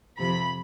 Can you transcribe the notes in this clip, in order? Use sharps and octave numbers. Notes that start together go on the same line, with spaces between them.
F2 C3 F3 B5